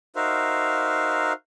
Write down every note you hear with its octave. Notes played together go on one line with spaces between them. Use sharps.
D#4 F#4 A#4 C5 E5 F5